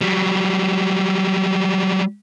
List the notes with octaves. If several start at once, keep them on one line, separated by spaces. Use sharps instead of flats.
F#3 G3